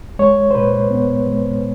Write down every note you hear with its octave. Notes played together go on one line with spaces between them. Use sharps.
G#3 C#5
C5
A#2 B4
B3
G#3